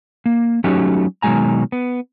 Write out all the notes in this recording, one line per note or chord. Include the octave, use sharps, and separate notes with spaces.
A#3
F#3 A3 C#4 D#4 F#4 G4
B2 D#3 F#3 G#3 G#5 A#5
B3